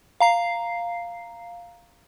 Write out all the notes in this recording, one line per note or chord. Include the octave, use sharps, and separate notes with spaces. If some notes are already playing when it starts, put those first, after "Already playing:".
F5 A#5 C7